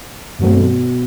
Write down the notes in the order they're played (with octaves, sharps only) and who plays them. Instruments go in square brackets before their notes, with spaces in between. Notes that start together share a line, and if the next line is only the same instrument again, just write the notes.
[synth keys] G2 D#3 F#3 A3 C4 [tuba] B2